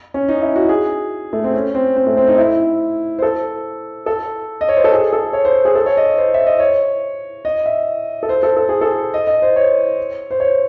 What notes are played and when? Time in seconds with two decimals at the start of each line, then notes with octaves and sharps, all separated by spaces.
0.14 C#4
0.28 D#4
0.42 E4
0.56 F#4
0.69 G#4
1.33 A3
1.44 C4
1.54 C#4
1.75 C4
1.96 C4
2.07 A3
2.17 C4
2.28 D#4
2.38 E4
3.19 C5
3.22 A4
4.06 A4
4.61 D#5
4.69 C#5
4.77 C5
4.84 A4
4.92 G#4
5.13 A4
5.33 C#5
5.45 C5
5.65 G#4
5.75 A4
5.86 C#5
5.97 D#5
6.18 C5
6.34 E5
6.47 D#5
6.60 C#5
7.45 D#5
7.66 E5
8.23 A4
8.29 C5
8.43 A4
8.57 A4
8.69 G#4
8.81 A4
9.14 D#5
9.27 D#5
9.42 C5
9.56 C#5
10.31 C5
10.40 C#5